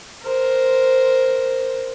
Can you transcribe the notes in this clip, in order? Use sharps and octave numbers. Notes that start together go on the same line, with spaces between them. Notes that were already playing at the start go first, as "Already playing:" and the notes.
A#4 C5